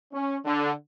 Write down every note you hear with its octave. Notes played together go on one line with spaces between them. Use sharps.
C#4
D3